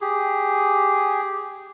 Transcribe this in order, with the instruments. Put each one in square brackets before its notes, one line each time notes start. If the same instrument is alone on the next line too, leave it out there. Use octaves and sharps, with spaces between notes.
[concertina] G4 G#4